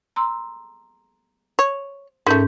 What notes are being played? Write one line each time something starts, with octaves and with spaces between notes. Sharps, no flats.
A#5 C6 E6
C#5
G#2 D#3 A3 C#4 G6